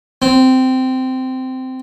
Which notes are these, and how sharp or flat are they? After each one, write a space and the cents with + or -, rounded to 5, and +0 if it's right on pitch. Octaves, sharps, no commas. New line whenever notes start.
C4 -15